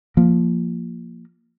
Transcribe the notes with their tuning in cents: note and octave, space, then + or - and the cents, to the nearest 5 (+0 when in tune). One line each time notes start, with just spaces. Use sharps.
F3 +0 A#3 +0